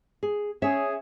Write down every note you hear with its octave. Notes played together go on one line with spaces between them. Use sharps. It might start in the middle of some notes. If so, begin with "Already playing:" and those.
G#4
C#4 G#4 C#5 E5